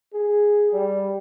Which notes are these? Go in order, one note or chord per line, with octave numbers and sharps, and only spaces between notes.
G#4
G3